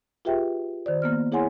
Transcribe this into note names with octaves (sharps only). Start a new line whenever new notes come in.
F4 G4 G#4 B4 E5 G5
D#3 C5 D5
A#3 B3 F6
E4 G#4 C#5 F#5 G#5 C6